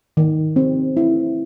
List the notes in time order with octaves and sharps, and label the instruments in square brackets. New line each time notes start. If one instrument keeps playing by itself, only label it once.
[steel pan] D#3
C4
E4